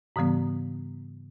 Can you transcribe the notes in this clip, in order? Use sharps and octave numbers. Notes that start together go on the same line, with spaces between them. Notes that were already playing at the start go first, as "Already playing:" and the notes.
G#2 C#3 E3 G3 B3